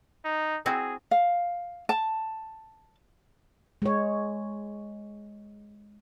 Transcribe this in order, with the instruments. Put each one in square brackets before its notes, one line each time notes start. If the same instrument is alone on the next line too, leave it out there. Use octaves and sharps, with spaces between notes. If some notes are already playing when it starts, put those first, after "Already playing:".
[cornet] D#4
[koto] C4 E4 F#4 [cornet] G#4
[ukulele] F5
A5
[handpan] G#3 C#5